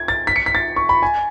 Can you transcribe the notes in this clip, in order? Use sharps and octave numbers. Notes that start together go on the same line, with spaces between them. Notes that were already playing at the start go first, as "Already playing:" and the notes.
Already playing: G#6
A6
B6
C#7
B6
A6
C#6
B5
G#5